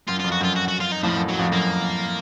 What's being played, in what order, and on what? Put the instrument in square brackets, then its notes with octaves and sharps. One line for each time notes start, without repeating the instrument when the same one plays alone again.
[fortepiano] F#2 [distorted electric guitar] F4
[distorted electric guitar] F4
[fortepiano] F2
[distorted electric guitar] F#4
[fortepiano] F#2 [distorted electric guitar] F4
[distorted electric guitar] F#4
F#4
F4
D#4
[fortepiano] F2 A2 [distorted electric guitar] F3
[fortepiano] F#2
[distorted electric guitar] F#3
[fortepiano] F2
[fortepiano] F#2 [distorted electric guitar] A#3